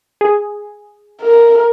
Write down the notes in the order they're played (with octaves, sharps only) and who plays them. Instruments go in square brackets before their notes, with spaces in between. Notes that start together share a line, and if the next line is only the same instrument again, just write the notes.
[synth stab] G#4
[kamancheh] A#4